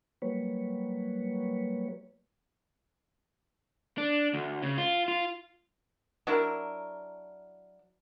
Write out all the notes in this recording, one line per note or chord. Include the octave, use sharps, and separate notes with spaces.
F#3 G3 A#3 B4 C#5
D4
D2
C#3
F4
F4
F#3 D4 E4 A#4